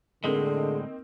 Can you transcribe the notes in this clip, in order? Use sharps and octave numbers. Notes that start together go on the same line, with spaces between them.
A2 D3 G#3 A#3 C4 D#4 G#4